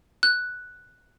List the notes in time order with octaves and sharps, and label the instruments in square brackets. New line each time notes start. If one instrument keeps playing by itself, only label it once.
[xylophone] F#6